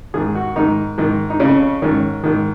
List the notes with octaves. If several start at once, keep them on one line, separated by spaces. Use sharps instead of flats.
G#2 D#3 G#4
F#4
G#2 D#3 D#4
G#2 D#3
D#4
F2 C#3 C#4
G#2 D#3 C#4
G#2 D#3